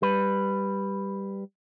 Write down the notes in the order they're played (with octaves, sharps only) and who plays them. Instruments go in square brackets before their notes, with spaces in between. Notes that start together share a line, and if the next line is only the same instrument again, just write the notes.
[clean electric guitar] G3 B4